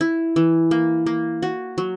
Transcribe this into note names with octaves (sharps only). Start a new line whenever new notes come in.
E4
E3
A#3
A#3
F#4
F#3